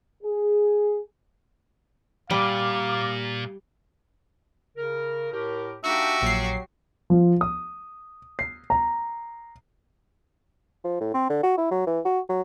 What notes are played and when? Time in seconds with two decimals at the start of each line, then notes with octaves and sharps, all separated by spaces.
0.23 G#4
2.31 A#2 G3 F5 D6
4.77 C#3 A#4
5.32 A2 G4 A#4
5.84 A#3 D4 D#4 F#4 G4 E5
6.22 A#1 F#3 C7
7.10 F3
7.41 D#6
8.39 C7
8.70 A#5
10.84 F3
11.00 A2
11.14 C4
11.30 D3
11.43 F#4
11.58 E4
11.71 F#3
11.87 E3
12.05 F#4
12.29 F#3